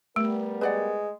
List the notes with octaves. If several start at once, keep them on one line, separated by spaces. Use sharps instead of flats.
G3 A3 B3 A#4
G#3 B4 D5 F#5